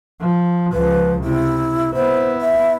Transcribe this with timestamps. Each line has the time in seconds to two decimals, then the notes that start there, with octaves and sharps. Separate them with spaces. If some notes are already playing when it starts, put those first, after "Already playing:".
0.21 F3
0.73 C#2 F3 B4
1.24 C3 E4
1.95 B3 E4 C5
2.41 E5